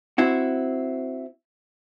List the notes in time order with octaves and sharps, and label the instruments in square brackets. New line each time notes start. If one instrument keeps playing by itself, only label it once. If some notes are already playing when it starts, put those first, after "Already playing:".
[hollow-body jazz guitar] C4 E4 F#4